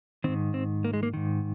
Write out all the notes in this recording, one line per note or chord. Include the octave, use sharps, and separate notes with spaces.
G#2 D#3 C4
C4
A#3
G#3
A#3
G#2 D#3